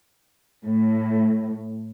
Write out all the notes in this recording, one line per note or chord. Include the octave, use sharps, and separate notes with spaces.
A2